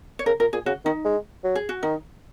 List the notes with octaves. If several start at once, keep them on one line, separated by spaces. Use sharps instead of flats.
C#5
C#3 A#4
A#2 A#4
A#2 G#4
C#3 F#4
D#3 D#4
G#3
F#3
G#4
F#4
D#3 D#4